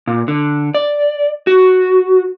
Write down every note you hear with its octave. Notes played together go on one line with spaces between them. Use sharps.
A#2
D3
D5
F#4